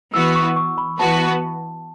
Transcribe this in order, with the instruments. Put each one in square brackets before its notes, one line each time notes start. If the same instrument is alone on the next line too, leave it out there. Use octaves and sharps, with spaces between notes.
[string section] E3 B3 F#4 B4 [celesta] E6
[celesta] C#6
C#6
B5
[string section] E3 B3 F#4 B4 [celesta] A5